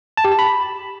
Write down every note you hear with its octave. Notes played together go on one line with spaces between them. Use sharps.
A5
G4
A5
B5